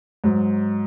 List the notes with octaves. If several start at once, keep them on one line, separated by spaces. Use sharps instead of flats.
G#2 F#3